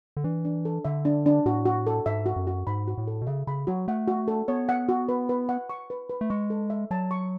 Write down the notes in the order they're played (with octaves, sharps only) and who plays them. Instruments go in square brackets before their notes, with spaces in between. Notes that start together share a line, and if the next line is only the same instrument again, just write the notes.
[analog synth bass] D3
[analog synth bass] E3 [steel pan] D4
[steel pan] D4
A4
[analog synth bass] D3 [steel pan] E5
[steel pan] D4
D4
[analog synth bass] A2 [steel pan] F#4
[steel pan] F#4
A4
[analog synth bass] G#2 [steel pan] E5
[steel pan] F#4
[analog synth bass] F#2
[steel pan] F#4
[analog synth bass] G#2 [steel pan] B5
[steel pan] F#4
[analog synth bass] A2
[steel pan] A4
[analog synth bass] B2
[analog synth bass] C#3 [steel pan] E5
[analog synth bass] C#3 [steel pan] B5
[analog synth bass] F#3 [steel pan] F#4
[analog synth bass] A3 [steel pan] F#5
[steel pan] F#4
A4
[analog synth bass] B3 [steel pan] C#5
[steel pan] F#5
F#4
B4
B4
F#5
C#6
B4
B4
[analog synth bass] A3
[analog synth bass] G#3 [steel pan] C#6
[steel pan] A4
E5
[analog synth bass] F#3 [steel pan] A5
[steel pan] C#6